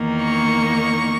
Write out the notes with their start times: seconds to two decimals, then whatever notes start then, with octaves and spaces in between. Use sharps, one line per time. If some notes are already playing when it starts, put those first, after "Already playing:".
Already playing: E2 D#3 A#3 D#4
0.22 C#6